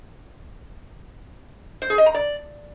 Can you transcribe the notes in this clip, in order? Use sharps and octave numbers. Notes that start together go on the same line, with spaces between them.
C5
G#4
D#5
A#5
D5